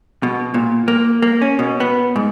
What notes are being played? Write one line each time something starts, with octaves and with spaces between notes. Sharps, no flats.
B2
A#2
A#3
A#3
C#4
B2
B3
G#2